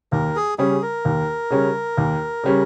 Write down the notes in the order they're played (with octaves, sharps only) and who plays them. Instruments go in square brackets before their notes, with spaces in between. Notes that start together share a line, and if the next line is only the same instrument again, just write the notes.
[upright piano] D#2 [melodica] A#4
[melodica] G#4
[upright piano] C#3 G3 C#4 [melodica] G#4
[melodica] A#4
[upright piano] D#2
C#3 G3 C#4
D#2
C#3 G3 C#4